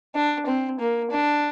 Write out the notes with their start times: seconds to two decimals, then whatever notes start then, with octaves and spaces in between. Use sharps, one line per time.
0.15 D4
0.46 C4
0.80 A#3
1.11 D4